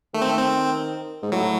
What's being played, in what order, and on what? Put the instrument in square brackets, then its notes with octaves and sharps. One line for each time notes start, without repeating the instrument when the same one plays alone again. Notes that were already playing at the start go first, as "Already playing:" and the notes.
[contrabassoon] D#3 [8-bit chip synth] A3
[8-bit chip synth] C4
A3
C4
[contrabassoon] G#2
[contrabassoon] A2 [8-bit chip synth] F#3